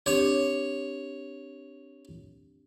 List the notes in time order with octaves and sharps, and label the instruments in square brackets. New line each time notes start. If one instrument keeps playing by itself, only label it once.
[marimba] C4 D4 G4 [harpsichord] C#5